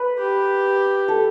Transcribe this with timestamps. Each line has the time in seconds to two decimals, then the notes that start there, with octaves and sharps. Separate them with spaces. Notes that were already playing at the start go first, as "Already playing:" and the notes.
Already playing: B4
0.19 G4
1.08 A4